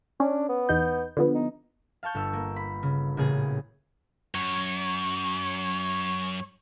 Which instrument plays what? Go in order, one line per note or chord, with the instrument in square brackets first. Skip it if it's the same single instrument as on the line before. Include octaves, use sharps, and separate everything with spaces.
[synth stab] C#4 [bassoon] D4
[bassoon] B3
[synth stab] E2 D#4 G6
D3 F3 B3
[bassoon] D#4
[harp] F5 A5 C#6 G6
G1 E6
A#3
B5
C#3
A1 A#2 C#3 B3 G#4 G#5
[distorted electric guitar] F#2 [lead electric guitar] C#5